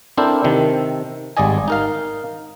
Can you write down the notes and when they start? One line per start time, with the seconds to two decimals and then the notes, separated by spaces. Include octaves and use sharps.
0.18 C4 D4 E4 A4 A#4 C5
0.44 C3 D#3
1.37 G#1 G3 G#4 D5 D#5 G#5
1.68 D#4 A#4 F5